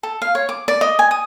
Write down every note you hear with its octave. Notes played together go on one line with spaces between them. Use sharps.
A4
F5
C#5
D6
D5
D#5
G#5
D#6